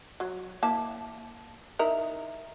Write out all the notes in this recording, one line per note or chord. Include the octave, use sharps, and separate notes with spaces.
F#3
A#3 E4 A5
D#4 E4 A#4